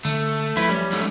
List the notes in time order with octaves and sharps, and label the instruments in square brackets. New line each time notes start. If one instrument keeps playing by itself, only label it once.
[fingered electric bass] D3 [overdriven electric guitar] A3
[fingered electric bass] F3 F#3 [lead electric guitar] E4 B4
[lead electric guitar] G3 C#4
[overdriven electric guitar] G#2 A3